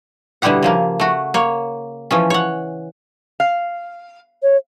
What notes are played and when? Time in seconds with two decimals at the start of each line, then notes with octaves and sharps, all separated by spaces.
0.42 B2 D3 G3 E4 G4 F#5
0.63 C#3 F3 A#3
1.00 A3 F#4
1.34 A#3 C#5
2.11 E3 F3 C#4
2.30 C#5 F#5
3.40 F5
4.43 C#5